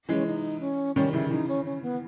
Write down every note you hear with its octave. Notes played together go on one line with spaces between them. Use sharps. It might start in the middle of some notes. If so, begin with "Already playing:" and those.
E3 G#3 C#4
D#4
C#4
D#3 G3 C#4
C#3 E3 E4
C#3 E3 D#4
C#4
C#4
B3